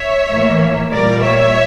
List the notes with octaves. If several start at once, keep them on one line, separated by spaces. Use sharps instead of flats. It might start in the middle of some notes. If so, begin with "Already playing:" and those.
Already playing: C#5 E5
A2 E3 A#3
A#2 G3 A#3 A#4 D5
C#5 E5